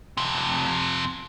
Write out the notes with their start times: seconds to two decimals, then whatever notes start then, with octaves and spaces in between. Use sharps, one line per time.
0.17 F2 C3